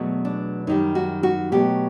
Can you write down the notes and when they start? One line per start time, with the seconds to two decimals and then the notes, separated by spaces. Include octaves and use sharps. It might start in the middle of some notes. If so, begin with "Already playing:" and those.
Already playing: E2 B2 F#3 A3
0.25 D4
0.67 F#2 D#3 G3 D#4
0.95 F#4
1.23 F#4
1.52 B2 F#3 A3 G4